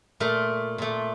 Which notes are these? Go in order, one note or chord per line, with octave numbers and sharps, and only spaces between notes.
A#2 A3 A#4
A#2 A3